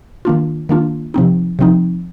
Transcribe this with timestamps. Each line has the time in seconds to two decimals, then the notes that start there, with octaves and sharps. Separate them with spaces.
0.25 D#3 A#3 D4 F4
0.69 D#3 A#3 D4 F4
1.14 C3 F3 C4 D#4
1.59 C3 F3 C4 D#4